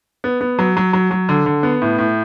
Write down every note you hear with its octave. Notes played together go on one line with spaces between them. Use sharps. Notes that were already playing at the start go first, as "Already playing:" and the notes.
B3
B3
F#3
F#3
F#3
F#3
D3
D3
B3
A2
A2